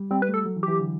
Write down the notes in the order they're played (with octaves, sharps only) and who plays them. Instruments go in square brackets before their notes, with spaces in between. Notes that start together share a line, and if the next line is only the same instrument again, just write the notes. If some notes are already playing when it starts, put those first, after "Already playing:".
Already playing: [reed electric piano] G3
[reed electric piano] G3 [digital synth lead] C4
[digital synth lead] B4
[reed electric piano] A3
[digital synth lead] A4
[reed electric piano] F#3
E3
[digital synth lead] G4
[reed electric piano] E3
D3